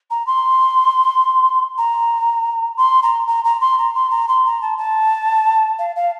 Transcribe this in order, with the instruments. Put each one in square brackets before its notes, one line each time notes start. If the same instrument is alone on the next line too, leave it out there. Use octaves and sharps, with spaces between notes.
[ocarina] A#5
C6
A#5
C6
A#5
A#5
A#5
C6
A#5
C6
A#5
C6
A#5
A5
A5
F5
F5